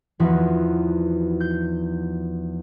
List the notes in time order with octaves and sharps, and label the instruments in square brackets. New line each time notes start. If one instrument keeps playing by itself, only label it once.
[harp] E2 E3 F3 D#4 F#4 B4
G6